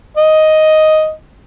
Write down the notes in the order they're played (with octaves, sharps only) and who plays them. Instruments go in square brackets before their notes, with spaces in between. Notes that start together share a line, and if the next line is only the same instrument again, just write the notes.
[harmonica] D#5